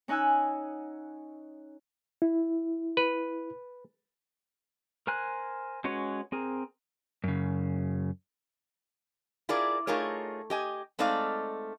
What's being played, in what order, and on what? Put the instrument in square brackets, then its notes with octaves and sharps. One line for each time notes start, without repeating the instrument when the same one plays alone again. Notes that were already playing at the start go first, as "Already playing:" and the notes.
[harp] C#4 D#4 F#5 G#5 E6 F#6
[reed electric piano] E4
[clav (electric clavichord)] B4
[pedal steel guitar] A#4 C5 G#5 F#6
G#3 C#4 F#4 B4 C#5
C4 G#4 A#4
[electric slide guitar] F#2 C#3
[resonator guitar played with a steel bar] E4 F4 G#4 A#4 D5
A3 D#4 F4 G#4 A#4 C#5
G4 D#5 G#5
G#3 A3 C4 D#4 D5 F5